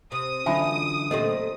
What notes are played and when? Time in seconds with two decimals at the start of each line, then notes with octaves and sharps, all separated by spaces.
0.12 C3 D#6
0.46 F#2 D3 E3 D#4 F4 E5 G#5 B5
1.11 A#2 A3 C4 G4 D#5